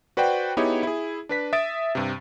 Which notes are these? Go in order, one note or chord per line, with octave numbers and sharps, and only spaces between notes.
F#4 B4 C5 D5 F#5 G5
B3 D#4 E4 G4 G#4 C#5
E4 G#4
D4 B4 B6
E5 D#6 A6 D7
G2 C3